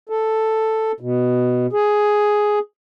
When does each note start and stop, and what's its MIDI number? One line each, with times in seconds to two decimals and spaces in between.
0.09 0.92 69
1.00 1.66 47
1.73 2.59 68